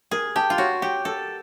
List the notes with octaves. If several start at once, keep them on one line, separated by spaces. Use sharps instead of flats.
G#4 A#4
G4 A5
F4
F#4 C#5
G4 F#5
A4 A#4